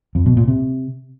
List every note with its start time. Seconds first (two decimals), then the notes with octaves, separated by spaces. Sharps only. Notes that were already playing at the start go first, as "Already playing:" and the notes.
0.15 F2
0.26 B2
0.37 A#2
0.48 C3